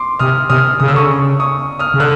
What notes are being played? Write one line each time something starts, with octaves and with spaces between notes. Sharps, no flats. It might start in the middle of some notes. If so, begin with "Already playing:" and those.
Already playing: C6 D6
C3 D#6 F6
C3 D#6 F6
C#3 D#6
E6
D3 C#6 D#6
C#3
C#6 D#6
D#6 F6
C#3
D3 E6 F#6